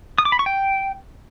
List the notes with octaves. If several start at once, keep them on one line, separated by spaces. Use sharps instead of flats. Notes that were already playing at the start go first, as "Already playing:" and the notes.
D#6
D6
B5
C#6
G5